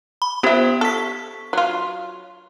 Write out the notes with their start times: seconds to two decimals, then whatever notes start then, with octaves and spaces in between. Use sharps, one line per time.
0.22 B5
0.43 B3 F4 G4 C5 E5
0.81 A4 C#6 B6
1.53 F#3 F4